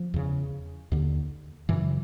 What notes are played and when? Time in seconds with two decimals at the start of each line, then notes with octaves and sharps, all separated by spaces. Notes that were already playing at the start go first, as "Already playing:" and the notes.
Already playing: F3
0.14 E2 C#3
0.92 D#2 D3
1.69 F#2 C#3 E3 F#3